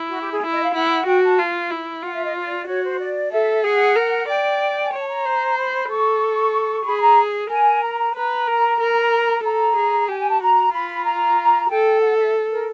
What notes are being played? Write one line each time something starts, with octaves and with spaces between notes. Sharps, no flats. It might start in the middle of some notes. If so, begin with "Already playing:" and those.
Already playing: E4
F#4
G4
G#4
E4
D#5
F5
E4 F#5
F#4 G5
A5
F4
E4
F4 F#5
E5
D#5
D5
F#4 C#5
C5
D5
A4 E5
G#4 F#5
A#4
D5 G5
G#5
C#5 A5
A#5
C5
B5
A4 C#6
G#4 B5
A#5
A#4 G#5
A#5
A#5
B4 A#5
A#4
A#4
A4 A#5
G#4
G4 G#5
G#5
A5
F#4 A#5
F4 B5
A#5
A4 G5
F#5
E5
A#4